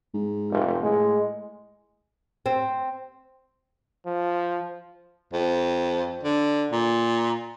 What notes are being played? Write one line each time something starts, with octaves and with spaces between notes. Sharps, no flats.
G#2
F1
A2 G#3
C4
F3
F2
D3
A#2